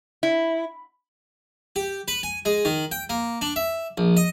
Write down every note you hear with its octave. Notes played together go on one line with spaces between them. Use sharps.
E4
G4
B4
G#5
G#3
D#3
G5
A#3
D4
E5
A#1
D#5